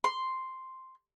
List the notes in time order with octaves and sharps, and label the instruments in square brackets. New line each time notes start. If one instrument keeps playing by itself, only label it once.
[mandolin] C6